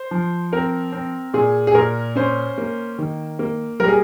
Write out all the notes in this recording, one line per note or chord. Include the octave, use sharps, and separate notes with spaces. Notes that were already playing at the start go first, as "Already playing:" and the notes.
Already playing: C5
F3
C4 A#4
C4
A#2 G#4
G#4
A#2 A#4
C#4 C5
A#3
D#3
A#3
G3 A#4
G#4